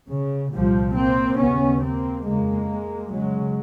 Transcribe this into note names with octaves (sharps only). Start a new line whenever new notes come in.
C#3
C2 A#2 F3 G3
A#3 C4
D#2 C#3 B3 C#4
A#3 C4
F2 C#3 G#3 A#3
F#2 C#3 F#3 G#3